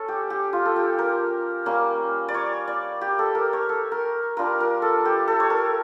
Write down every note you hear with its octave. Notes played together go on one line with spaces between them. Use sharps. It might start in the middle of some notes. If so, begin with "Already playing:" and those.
Already playing: C#4 A4
G4
G4
F4
A4
G4
A#4
G3 A#3 C#4
D5
C#5
D5
G4
A4
A#4
C#5
A4
A#4
G3 D4 F4 A#4
A#4
A4
G4
A4
C#5
A#4